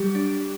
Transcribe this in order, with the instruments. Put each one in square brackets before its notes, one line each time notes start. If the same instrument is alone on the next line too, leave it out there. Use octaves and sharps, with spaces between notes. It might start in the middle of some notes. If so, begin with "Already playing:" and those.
Already playing: [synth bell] F#3 G3 [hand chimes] G4
[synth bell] D4